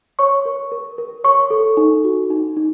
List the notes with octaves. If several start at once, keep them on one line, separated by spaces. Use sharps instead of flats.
C#5 C#6
A#4
A#4
A#4
C#5 C#6
A4
D#4
F#4
D#4
D#4